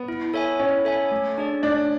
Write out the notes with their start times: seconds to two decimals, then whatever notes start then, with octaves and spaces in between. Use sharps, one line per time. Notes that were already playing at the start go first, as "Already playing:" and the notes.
Already playing: B3
0.08 E4
0.34 A4 C#5 E5 G#5
0.59 C#4 E4
0.85 A4 C#5 E5 G#5
1.12 A3
1.38 D4 G#4 D5
1.63 A3 D4